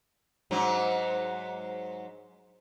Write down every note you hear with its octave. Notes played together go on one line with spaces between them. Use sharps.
G#2 F#3